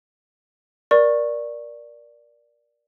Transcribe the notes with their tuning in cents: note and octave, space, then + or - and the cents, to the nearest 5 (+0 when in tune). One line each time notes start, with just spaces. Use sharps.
A#4 +20 D5 +0 C#6 -15